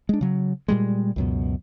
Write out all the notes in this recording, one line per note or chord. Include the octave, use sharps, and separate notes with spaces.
G#3 D4
C#3 F#3
A#2 G3 G#3
C#2 F#2 B2